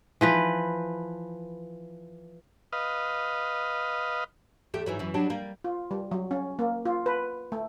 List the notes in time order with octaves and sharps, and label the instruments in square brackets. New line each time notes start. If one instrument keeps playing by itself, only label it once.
[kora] E3 F3 B4
[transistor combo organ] B4 D#5 F5
[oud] E2 A3 G4
G#2 E3 F#3
F#2 E3
F#3 G3 D4
G3 A#3
[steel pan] F4
G3
F#3
C#4
A#3
F4
B4
A3